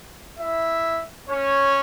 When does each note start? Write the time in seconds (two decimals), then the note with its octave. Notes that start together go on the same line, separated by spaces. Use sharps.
0.39 E4 E5
1.29 C#4 C#5